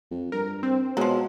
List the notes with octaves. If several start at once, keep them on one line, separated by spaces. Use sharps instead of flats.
F2
G2 A#4
C4
B2 F3 F#3 G#3